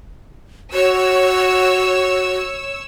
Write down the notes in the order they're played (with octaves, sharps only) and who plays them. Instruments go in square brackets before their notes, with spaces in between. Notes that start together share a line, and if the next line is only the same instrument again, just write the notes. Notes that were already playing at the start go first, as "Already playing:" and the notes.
[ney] F#4 [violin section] C#5 E6